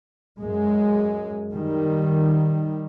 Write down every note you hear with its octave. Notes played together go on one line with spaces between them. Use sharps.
F#2 G#3
D#3 G3